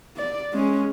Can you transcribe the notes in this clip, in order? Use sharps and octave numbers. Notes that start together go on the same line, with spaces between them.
D5
G#3 C#4